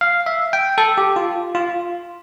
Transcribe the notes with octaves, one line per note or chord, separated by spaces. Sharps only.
F5
E5
G5
A4
G4
F4
F4